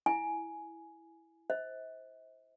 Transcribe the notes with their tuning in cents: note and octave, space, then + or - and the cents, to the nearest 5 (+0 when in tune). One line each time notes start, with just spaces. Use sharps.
E4 +0 G#5 +10
C5 +0 E5 -45